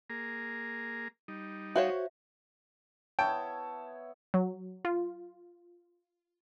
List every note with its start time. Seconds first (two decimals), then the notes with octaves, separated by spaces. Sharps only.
0.10 A#3 G#4 A#5
1.28 G3 D#4
1.76 F#4 C5 C#5 E5 F5
3.19 B3 E4 C#5 G5 A5
4.34 F#3
4.85 F4